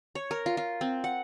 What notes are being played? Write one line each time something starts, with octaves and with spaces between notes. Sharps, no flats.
C#5
A#4
F4
F4
C4
F#5